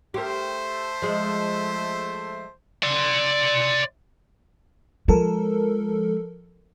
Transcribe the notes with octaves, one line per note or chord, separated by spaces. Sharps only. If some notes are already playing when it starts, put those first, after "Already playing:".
A3 G4 A#4 C5
F3 G#3
D5 C6
F3 G#3 A4 A#4